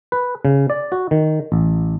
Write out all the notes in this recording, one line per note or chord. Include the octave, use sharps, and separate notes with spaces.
B4
C#3
D5
F#4
D#3
A1